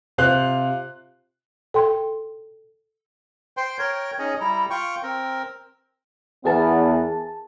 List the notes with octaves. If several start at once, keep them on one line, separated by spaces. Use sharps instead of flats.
C3 F4 C5 F5 F#6
A4 G5 C6
C5 G5 C6
A#4 C#5 G5
C#4 D#4 G#4 D#5
G3 E4 A#5
F4 G5 C#6
C4 A#4
E2 B3 G#4 A#4 A5